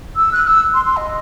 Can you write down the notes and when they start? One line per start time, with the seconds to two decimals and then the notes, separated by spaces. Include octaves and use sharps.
0.16 E6
0.32 F#6
0.47 E6
0.74 C6
0.85 C6
0.97 D#5